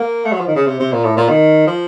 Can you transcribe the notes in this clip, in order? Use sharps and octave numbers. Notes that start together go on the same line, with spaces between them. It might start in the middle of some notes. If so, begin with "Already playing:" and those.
Already playing: A#3
A3
F#3
F3
D#3
C#3
C3
C3
A#2
A2
A#2
D#3
F3